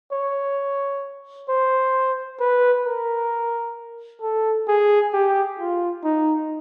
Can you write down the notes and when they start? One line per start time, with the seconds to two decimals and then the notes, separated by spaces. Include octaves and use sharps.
0.12 C#5
1.49 C5
2.40 B4
2.85 A#4
4.22 A4
4.68 G#4
5.13 G4
5.59 F4
6.04 D#4